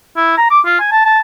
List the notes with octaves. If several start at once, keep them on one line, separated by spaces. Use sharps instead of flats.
E4
A#5
D6
F4
G#5
A5
A5